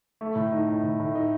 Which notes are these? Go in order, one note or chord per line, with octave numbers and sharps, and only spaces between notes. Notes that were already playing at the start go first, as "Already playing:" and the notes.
A3
A2
D#4
A2
A2
A2
D#4